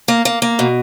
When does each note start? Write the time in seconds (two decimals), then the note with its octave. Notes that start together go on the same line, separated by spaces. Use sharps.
0.08 A#3
0.25 A#3
0.42 A#3
0.59 B2